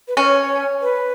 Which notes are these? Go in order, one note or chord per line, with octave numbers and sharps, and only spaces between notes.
B4
C#4 C#5
B4